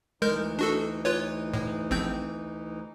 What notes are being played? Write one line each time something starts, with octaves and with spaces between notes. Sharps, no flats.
D2 E3 G#3 D#4 A#4 G6
D4 F#4 A4
F4 B4 C#5
A2
A#1 C4 G6